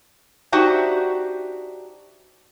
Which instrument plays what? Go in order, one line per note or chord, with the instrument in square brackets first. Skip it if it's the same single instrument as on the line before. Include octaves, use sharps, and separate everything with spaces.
[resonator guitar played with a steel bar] D4 D#4 F#4 G4 C5 E5